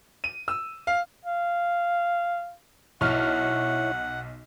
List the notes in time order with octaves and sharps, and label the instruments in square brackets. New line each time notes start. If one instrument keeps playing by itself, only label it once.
[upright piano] D#7
E6
F5
[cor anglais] F5
[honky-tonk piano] B1 F6 [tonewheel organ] E4 C#5 [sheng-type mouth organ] F#5